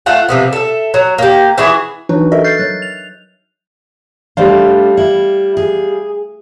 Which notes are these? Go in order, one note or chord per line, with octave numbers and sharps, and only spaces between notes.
A3 F4 F#5
C3 F3 B3
A4 E5
F#3
A#3 G4
E3 E4 F#4 G#4
E3 F#3 D4 D#4 F#4 B4
F#4 A4 A#4 D#5 E5
F6 G6 A6 C7
F#3 F#6 A6
F7
G3 A3 D4 C5 F5
E4
G#4